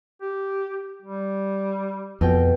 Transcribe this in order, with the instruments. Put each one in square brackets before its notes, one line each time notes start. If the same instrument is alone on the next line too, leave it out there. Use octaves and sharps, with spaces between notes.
[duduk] G4
G3
[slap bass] F2 [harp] B2 G5